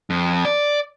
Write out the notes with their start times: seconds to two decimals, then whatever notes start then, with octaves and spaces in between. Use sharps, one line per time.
0.10 F2
0.45 D5